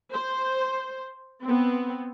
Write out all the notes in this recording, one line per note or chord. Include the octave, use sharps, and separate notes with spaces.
C5
B3 C4